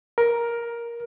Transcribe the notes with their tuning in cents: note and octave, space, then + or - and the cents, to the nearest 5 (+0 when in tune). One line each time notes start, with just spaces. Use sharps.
A#4 +10